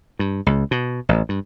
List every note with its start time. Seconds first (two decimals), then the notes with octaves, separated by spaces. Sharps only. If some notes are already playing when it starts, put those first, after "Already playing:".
0.19 G2
0.46 C#2
0.71 B2
1.09 A1
1.29 G2